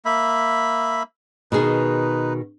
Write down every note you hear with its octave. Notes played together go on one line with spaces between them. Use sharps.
A#3 E5 B5
B2 D#3 D#4 G#4 B4